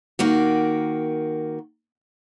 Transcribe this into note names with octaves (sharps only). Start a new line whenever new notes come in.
D#3 A#3 F#4